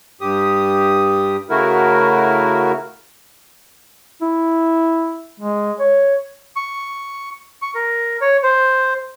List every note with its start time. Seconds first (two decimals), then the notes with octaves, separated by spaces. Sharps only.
0.21 G2 G4 D#6
1.50 C#3 A3 E4 F#4 A#4
4.21 E4
5.40 G#3
5.80 C#5
6.56 C#6
7.62 C#6
7.75 A#4
8.21 C#5
8.43 C5